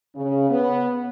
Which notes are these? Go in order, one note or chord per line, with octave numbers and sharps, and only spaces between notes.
C#3
B3